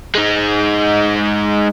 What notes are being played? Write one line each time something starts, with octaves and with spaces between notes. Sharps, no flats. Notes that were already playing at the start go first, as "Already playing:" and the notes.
G#3 D#4